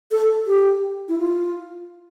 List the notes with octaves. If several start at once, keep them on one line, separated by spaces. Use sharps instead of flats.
A4
G4
E4
F4